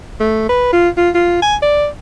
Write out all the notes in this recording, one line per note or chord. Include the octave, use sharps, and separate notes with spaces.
A3
B4
F4
F4
F4
G#5
D5